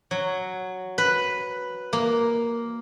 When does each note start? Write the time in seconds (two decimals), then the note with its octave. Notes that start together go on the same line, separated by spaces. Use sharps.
0.11 F#3
0.98 B4
1.93 A#3